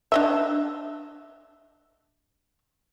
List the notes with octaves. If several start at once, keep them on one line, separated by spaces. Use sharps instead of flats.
D4 D#5 E5